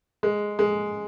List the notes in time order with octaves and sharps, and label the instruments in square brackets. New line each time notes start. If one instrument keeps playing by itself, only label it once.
[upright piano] G#3
G#3